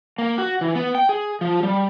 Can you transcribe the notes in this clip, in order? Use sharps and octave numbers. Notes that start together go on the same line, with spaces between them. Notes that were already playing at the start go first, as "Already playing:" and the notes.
A#3
F#4
E3
B3
G5
G#4
F3
G3